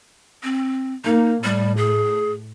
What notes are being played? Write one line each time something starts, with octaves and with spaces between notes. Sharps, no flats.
C4
A#3 D#4
A2 G3
G#4